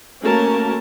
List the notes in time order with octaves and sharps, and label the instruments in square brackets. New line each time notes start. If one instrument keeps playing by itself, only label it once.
[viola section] A3 A#3 C#4 F#4 A#4 A5